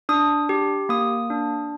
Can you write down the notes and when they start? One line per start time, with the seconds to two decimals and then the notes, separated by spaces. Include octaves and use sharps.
0.09 D4 D#6
0.49 G4
0.89 A#3 D#6
1.30 D4